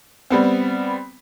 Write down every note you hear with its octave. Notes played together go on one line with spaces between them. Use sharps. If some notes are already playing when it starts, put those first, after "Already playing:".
G3 B3 C4